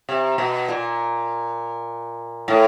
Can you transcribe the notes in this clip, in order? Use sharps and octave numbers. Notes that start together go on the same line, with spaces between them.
C3
B2
A#2
A2